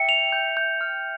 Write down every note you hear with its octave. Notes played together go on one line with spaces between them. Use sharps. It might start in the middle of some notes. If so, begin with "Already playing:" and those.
Already playing: E5 G5 C#7
F7
G6
G6
F6